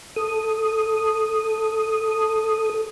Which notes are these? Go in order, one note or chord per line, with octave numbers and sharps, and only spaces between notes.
A4 D#6